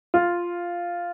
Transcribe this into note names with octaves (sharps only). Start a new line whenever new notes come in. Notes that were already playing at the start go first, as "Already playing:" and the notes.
F4